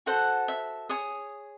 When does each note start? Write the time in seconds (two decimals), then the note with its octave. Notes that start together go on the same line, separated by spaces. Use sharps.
0.06 F#4 A4 C5 F#5
0.48 E5
0.89 G#4 C#5 D#6